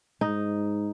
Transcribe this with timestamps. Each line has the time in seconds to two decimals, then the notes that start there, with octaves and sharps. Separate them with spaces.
0.21 G#2 D#4